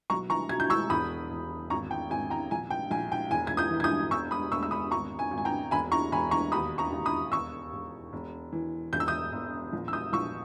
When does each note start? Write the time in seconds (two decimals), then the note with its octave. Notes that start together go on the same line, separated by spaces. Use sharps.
0.10 B1 A#5 C#6
0.30 A#5 C#6
0.49 B2 G#6
0.60 G6
0.70 C#6 E6
0.90 E1 B5 D#6
1.30 E1
1.70 G#1 A#5 C#6
1.91 G5
2.10 G#1 G#5
2.30 G5 A#5
2.51 A#1 G#5
2.70 G5
2.91 A#1 G#5
3.12 G5
3.31 E1 G#5
3.47 G#6
3.57 D#6 G6
3.71 E3
3.80 G#6
3.84 D#6 G6
4.11 E1 C#6 E6
4.31 B5 D#6
4.51 E1 C#6 E6
4.63 E6
4.71 B5 D#6
4.91 G#1 A#5 C#6
5.19 G#5
5.31 G#1
5.38 G#5
5.45 G5 A#5
5.71 E1 G#5 B5
5.92 A#5 C#6
6.12 E1 G#5 B5
6.31 A#5 C#6
6.52 D#2 B5 D#6
6.78 A#5 C#6
6.92 D#2
7.06 B5 D#6
7.32 E1 C#6 E6
7.73 E1
8.13 E1
8.53 E3
8.93 E1 G6
9.00 E6
9.08 D#6 G6
9.32 E1
9.73 A#1
9.88 E6
9.93 D#6 G6
10.13 A#1 C#6 E6